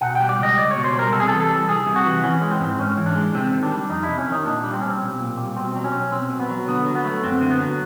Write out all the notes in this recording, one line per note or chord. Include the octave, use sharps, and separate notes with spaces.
B2 F#5
G5
G3
D5
C#2 D#5
C#2 D5
C#5
B2
C5
G3
A#4
C3 A4
G#4
E3 A4
A4
G3
C2 G#4
C3
F#4
E3
E3 C#4
G#3
C4
G#2
G#2 C#4
E3
D4
G#3
C3 C4
D#3
D4
G3
F2 D#4
E4
C3
C#4
D#3 D#4
A#2 D4
G3
C4
B1 C#4
C4
B1
A#2
G3
B2 C4
F#3
C#4
B1
B1 C4
B2
B3
F#3
D3 B3
F#3
B3
A3
F#2 C4
D3
B3
F#3